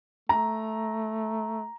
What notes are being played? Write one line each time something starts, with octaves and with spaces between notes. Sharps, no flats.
A3 A#5